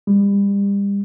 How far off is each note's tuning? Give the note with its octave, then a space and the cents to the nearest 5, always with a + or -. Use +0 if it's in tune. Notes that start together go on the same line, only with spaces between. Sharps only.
G3 +35